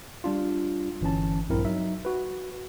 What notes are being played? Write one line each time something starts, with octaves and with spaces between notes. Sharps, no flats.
G3 D4 F4
G1 E3 C#4 A5
A#1 G2 C4 E4 A#4
F#3 D#4 E5
F#4 B4